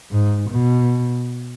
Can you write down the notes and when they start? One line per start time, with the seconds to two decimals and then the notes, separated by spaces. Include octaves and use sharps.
0.11 G#2
0.50 B2